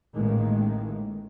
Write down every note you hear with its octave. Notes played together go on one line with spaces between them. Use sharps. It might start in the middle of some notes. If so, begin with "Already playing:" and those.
A1 A2 D#3 G#3 A#3